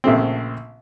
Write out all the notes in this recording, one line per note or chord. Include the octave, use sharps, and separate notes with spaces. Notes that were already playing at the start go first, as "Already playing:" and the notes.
A#1 C#3 A3 C4